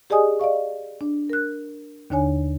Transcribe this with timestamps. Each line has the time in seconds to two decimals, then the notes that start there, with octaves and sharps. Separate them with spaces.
0.10 G4 G#4 D5 D#5 G#5 D#6
0.39 D5 D#5 F5 C#6
1.01 D4
1.30 A#4 F#6
2.10 D#2 D3 D4 C#5 G#5